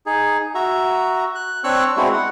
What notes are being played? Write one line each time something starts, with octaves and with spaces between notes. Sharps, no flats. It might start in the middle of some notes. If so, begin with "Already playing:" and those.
D#4 G#4
F#4 E5 A#5
F#6
C4 D4 C#5 C#6 E6 F#6
G#3 B3 C4 D4 E4 F#4
F#5